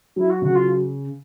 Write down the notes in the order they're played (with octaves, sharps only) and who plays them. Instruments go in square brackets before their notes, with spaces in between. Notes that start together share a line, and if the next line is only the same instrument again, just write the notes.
[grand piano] F#3 [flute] E4
[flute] F#4
[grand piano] C#3 [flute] F#4
[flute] F4